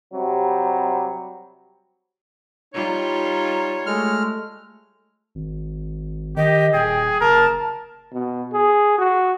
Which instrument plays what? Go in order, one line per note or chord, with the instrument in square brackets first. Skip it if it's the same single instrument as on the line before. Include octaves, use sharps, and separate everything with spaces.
[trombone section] C3 F#3 G3
[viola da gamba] G3 F4 [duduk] D#4 [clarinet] C#5
[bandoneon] G#3 F6 [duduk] A3
[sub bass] G#1
[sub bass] D#3 [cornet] G4 [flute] D#5
[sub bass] D#1 [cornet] G#4 [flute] G5
[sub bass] F#1 [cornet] A#4 [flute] A5
[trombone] B2
G#4
F#4